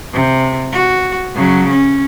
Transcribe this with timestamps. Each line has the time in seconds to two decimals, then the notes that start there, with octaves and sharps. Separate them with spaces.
0.13 C3
0.72 F#4
1.35 C#3 F#3
1.70 C#4